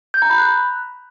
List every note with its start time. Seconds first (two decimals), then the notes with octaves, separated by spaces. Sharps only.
0.14 G6
0.22 A#5
0.30 B5
0.38 F#6